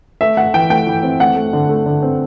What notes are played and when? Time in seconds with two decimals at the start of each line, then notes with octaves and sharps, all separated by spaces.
0.21 A3 E5
0.37 A3 F#5
0.54 E3 G5
0.70 A3 G5
0.87 E3
1.03 C4
1.20 A3 F#5
1.36 A3
1.53 D3
1.69 A3
1.86 D3
2.03 C4